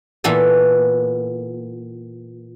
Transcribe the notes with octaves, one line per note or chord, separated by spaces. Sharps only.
A#2 E3 B3 A4 G#5